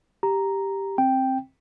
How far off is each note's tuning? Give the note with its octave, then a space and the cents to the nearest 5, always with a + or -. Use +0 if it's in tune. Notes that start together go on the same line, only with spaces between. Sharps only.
G4 +0 A#5 +0
C4 +15 G5 +0